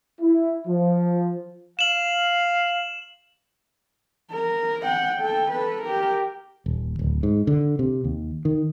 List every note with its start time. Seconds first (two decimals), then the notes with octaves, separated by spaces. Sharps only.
0.20 E4
0.67 F3
1.79 F5 E7 F#7
4.32 A#4
4.84 F#5 G5
5.21 A4 G5
5.51 A4 B4
5.82 G4 A#4
6.66 D#1
6.99 D1
7.23 G#2
7.47 D3
7.79 C3
8.04 D#2
8.45 D#3